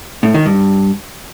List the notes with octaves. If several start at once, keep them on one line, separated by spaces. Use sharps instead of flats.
A2
D#3
G2